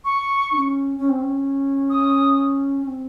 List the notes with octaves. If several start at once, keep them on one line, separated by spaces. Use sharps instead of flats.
C#6
D#4
C#4
C#4
C4
C#4
D#6
C#4
C4